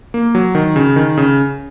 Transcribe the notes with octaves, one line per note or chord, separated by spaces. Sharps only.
A#3
F#3
D#3
C#3
D#3
C#3